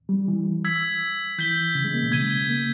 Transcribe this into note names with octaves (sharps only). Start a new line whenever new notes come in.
G3
E3
E6 G#6 B6
E3 G6 B6 G7
C#3
G#3
A#3
B2
C#3 G#6 D#7 G7
A#3